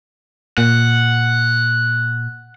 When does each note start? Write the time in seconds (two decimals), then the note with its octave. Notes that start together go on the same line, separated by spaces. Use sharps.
0.58 A#2 F#5